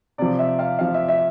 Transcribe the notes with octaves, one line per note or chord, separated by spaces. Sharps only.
C3 F3 D5
E5
F5
C3 F3 F5
E5
E5